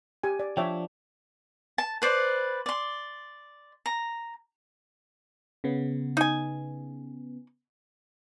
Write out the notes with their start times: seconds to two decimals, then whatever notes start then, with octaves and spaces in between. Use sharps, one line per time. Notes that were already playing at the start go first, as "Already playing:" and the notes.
0.23 G4 G#5
0.40 D5
0.57 F3 D4 C#5 E5 G5
1.78 A5
2.02 B4 C5 D5
2.66 D5 C6
3.86 A#5
5.64 C#3 B3
6.17 D#4 G#5